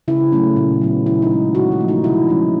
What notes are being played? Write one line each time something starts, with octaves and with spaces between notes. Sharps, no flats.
C#3 E4
F#3 A3 C#4
A#2
F#3 B3
D#3 E4
D#4
G#3 C#4
D3 F#4
F4
F3 A3
D#4
C3 E4
F3 G#3 C#4